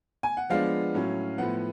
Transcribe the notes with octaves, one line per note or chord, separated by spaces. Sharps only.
G#5
F#5
F3 G#3 B3 D4 F5
A2 F#3 C#4
A2 F3 B3 F#5